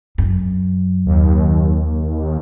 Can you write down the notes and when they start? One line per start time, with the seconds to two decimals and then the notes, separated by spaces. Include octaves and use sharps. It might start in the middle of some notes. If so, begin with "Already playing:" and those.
0.18 F#2
1.06 D#2